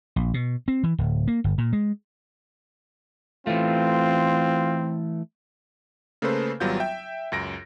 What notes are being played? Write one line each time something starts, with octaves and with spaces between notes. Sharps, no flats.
A#1
B2
C4
E3
D1
A#3
G1
A#2
G#3
E3 A3 C4 F4
C#3 A3 A#3 A4 B4 C5
G#1 F#3 G3 B3 F4 G6
E5 G5
C#2 F#2 A#6 D7